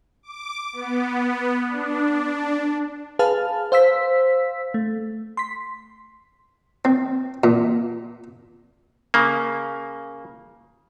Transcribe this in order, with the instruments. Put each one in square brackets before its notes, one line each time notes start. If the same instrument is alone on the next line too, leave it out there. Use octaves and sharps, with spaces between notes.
[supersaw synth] D6
B3
D4
[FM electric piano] G#4 B4 F5 A5 F6
C5 F5 E6 B6
A3
C6 B6
[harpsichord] C4
A#2
[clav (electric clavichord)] C#3 A#3